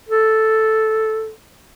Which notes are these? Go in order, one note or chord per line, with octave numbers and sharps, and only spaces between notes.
A4